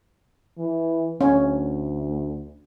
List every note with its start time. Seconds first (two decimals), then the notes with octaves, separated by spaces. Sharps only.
0.58 E3
1.21 D2 C#4